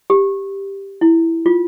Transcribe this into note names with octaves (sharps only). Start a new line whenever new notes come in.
G4
E4
F4